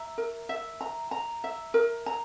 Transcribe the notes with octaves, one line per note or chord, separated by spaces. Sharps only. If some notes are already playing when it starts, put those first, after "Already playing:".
Already playing: E5 A#5
A#4
E5
A#5
A#5
E5
A#4
A#5